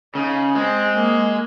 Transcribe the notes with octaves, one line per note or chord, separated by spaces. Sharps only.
C#3 D#4
G#3 C4
A#3